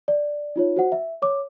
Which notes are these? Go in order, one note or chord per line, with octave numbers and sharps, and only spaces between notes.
D5
D#4 F4 C#5
F#4 C5 F#5
E5
C#5 D6